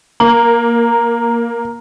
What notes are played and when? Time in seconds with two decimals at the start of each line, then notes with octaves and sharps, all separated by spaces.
0.20 A#3 A#5